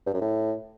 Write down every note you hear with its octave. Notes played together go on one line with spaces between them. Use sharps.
G2
F#2
A2